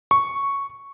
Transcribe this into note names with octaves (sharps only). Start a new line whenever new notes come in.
C#6